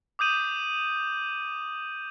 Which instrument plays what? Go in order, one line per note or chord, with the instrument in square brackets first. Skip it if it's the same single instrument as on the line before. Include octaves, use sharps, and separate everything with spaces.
[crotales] D6 D#6 G6 D#7 F#7